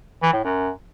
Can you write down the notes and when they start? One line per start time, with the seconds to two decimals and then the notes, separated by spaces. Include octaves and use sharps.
0.23 E3
0.33 A2
0.44 F#2